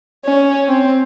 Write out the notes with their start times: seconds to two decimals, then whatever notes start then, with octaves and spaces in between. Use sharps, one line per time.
0.25 C#4
0.68 C4